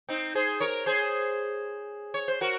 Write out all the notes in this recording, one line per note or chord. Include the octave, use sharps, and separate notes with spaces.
C4 D#4
G#4 C5
A#4 C#5
G#4 C5
C#5
C5
F#4 A#4